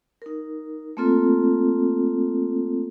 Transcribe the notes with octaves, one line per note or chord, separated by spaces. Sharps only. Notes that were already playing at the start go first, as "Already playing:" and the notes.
D#4 A#4
A3 A#3 C4 F4 A4